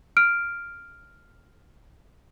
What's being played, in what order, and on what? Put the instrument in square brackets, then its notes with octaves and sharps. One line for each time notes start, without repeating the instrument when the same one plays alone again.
[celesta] F6 D7